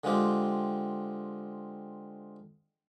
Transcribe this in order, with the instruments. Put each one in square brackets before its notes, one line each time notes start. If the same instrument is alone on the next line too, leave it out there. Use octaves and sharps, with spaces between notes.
[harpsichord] D3 G#3 C4 F4 G4